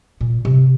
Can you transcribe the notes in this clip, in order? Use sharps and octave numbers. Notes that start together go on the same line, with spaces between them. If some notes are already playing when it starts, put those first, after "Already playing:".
A#2
C3